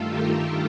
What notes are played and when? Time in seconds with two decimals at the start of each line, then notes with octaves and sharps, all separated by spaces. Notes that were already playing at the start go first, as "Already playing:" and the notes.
Already playing: G2 D#3 A3 F4 A4
0.09 G4 A#4